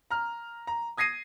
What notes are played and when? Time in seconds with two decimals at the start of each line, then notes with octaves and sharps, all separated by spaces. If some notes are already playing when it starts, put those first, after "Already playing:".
0.11 A#5 F6
0.67 A#5
0.97 D#6 G#6 A#6 C7 D#7